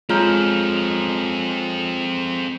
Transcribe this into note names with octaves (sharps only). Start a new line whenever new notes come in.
G#3 C4 F4 A4 C#5 A#5 F6 G6